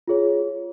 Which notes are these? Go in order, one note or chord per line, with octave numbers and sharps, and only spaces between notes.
F4 G#4 C#5